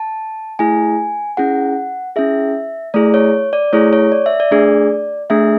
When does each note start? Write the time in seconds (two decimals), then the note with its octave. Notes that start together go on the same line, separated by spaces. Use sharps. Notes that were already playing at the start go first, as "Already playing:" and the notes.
Already playing: A5
0.59 A3 E4 G#4 G#5
1.37 C#4 E4 G#4 F#5
2.16 C#4 E4 G#4 E5
2.94 A3 E4 G#4 D5
3.14 C#5
3.53 D5
3.73 A3 E4 G#4 C#5
3.93 C#5
4.12 D5
4.26 E5
4.40 D5
4.51 A3 D4 G#4
5.30 A3 D4 G#4 E5